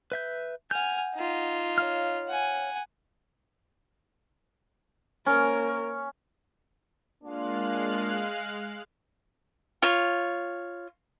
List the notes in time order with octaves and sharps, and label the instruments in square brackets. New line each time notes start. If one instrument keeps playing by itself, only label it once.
[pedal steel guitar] B4 E5 G6
[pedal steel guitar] F#5 G6 [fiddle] G#5 F6
[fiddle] D#4 F4
[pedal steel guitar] C#5 F5 F6
[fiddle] F#5 G#5
[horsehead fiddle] A#3 A#4 [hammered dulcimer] C#4
[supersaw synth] G#3 F5 F#6 [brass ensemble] A#3 D4 F4
[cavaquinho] F4 C#5